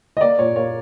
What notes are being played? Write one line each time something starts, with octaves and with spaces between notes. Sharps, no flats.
D#5
A#3 D5
A#2 C#5
A#3 C#5